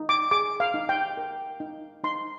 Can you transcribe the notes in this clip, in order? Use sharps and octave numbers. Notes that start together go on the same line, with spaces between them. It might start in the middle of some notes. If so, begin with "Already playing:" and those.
Already playing: D#4
D6
G#4 D6
F5
D#4
G5
A#4
D#4
D#4 C6